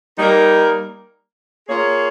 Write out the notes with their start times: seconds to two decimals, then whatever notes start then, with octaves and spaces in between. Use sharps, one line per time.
0.18 G3 A#3 D#4 A#4
1.68 A#3 F4 G#4 C#5